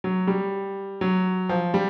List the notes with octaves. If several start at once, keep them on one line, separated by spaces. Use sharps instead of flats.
F#3
G3
F#3
F3
G3